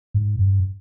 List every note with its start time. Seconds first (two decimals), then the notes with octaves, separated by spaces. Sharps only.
0.14 G#2
0.39 G2